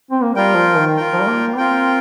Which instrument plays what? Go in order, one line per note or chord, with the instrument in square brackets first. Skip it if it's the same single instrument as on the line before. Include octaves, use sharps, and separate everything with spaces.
[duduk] C4
A#3
[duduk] G3 [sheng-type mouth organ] F4 A#4 G5
[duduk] F3
D#3
[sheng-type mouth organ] F4 A#4 G5
[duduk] F3
G3
A#3
[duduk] C4 [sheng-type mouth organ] F4 A#4 G5